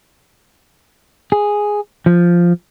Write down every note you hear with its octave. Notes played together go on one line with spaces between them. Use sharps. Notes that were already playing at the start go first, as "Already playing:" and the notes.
G#4
F3